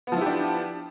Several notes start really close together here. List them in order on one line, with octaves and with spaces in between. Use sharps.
B3 F3 E4 G4 D4